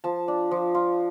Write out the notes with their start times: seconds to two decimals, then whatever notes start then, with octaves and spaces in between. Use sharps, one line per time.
0.04 F3 A5
0.28 D4
0.51 F3
0.75 F4